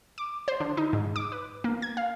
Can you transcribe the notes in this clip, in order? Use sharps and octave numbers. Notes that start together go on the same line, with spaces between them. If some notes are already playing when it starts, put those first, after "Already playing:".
D6
C5
D3
D#4
G#2
D6
B4
A#3
G#6
F5